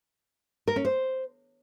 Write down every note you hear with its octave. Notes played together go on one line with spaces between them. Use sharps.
A#4
C#4
C5